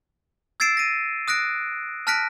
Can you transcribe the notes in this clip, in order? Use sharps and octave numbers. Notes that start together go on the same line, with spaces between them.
E6 G#6 A6 C7 D7 E7
A#6 D#7
D#6 F#6 A#6 D7
A5 F6 F#6 A#6 B6 D7